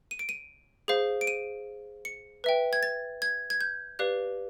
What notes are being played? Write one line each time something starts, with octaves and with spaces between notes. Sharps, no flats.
D#7
D7
D#7
G#4 C5 F5
D7
D#7
C#7
B4 E5 G5
G#6
A6
G#6
G#6
G6
G4 B4 D5 F5 F#6